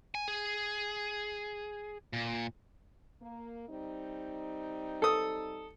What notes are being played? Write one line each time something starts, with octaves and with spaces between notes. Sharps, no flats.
G#5
G#4
A#2
A#3
G3 C4 D#4
A4 D#6